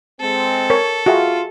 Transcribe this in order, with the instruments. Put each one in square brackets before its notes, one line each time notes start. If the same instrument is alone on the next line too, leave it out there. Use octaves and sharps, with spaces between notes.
[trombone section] G#3 C4 [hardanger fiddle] A4
[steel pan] A#4 C#5
[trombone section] F4 [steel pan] F#4 G#4 E5